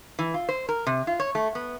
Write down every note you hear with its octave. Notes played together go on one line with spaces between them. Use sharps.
E3
F4
C5
A#4
C3
F4
C#5
A3
B3